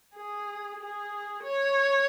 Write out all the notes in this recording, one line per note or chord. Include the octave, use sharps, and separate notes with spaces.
G#4
G#4
C#5